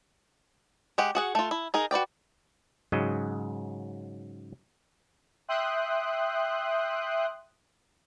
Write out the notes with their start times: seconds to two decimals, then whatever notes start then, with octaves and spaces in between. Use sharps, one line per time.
0.98 G#3 G4 F#5
1.15 F#4 G#4 F#5
1.35 A3 F4
1.51 E4
1.74 D#4 G#4 A#4
1.91 F#4 B4 D5 G5
2.92 G#2 C#3 F#3 D#5
5.48 E5 G5 C6 D#6 F#6